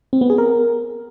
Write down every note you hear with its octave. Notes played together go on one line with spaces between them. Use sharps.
C4
B3
G#4
A#4